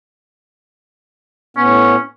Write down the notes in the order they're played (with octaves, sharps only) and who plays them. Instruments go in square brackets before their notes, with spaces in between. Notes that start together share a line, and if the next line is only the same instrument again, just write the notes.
[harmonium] A2 B3 [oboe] C#4